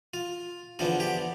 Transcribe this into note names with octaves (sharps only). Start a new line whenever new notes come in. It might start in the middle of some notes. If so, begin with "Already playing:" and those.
F4
E2 D3 F3 B3 F4
G4